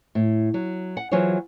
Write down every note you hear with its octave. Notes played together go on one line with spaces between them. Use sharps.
A2
F#3
F#5
E3 F#3 F4 G#4 C5 C#5